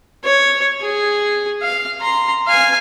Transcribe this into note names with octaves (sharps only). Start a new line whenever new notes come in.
C#5
G#4
F5
A#5 C6
F5 G#5